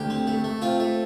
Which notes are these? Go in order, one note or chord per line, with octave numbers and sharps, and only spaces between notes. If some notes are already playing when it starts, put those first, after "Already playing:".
Already playing: D2 G4
C4
A3
A3
C4 F4
A3